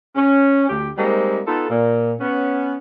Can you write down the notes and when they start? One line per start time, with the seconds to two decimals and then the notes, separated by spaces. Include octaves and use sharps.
0.16 C#4
0.69 D2 G4
0.98 G3 G#3 A#3 C4 D#4
1.47 B3 D#4 F4 A4
1.70 A#2
2.21 B3 C#4